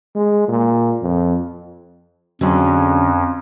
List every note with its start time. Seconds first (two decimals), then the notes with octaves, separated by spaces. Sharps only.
0.15 G#3
0.48 A#2
1.02 F2
2.41 F2 D3 F#3 C#4 D4 G#4